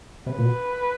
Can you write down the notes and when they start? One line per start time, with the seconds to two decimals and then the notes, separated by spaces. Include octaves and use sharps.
0.26 C3
0.32 C#3 B4
0.38 A#2
0.45 B2